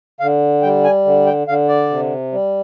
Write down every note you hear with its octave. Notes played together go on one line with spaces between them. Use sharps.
D3 F5
G3 G5
G#5
D3
G5
D3 F5
D5
C3
G3